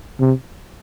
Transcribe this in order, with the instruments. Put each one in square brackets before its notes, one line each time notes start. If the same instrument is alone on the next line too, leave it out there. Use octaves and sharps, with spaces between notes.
[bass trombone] C3